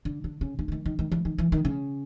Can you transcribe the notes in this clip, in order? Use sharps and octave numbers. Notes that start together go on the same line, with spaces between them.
D3
D3
C#3
D3
E3
D#3
D#3
D#3
E3
D#3
E3
D#3
C#3